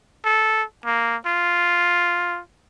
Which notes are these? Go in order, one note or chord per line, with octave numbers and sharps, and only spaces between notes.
A4
A#3
F4